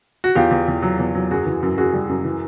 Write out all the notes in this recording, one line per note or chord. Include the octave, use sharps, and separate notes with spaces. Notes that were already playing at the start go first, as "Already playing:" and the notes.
F#4
E2 F4 G4
E2
E2
F#3
E2
F#3
F#2 F#4 G#4
E3
F#2
F#2 F#4 G#4
G3
F#2
E3